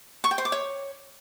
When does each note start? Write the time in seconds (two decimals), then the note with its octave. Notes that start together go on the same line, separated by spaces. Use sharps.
0.24 C#6
0.31 G5
0.38 C5
0.45 D6
0.52 C#5